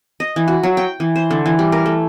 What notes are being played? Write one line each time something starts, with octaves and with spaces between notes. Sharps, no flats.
D#5
E3
F#4
F#3
G5
E3
C5
D3
E3
G3
A#4
A3